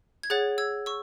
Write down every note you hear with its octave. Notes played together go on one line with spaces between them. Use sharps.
G#6
G#4 C#5 F#5 F#6 A6
E6 G#6
C#6 E6